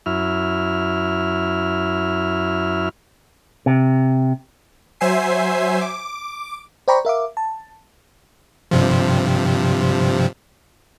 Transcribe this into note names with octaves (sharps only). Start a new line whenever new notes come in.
F#2 E4 F6
C3
F#3 C5 E5 G#5 C7
D6
C5 D5 G5 A#5 B5 C#6
A#4 E5 F5 D6
A5
G2 C3 F3